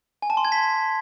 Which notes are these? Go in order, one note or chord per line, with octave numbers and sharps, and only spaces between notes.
G#5
A5
C6
G#6
B6